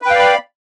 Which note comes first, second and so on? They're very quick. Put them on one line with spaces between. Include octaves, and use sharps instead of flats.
B4 G5 F5 D5 B5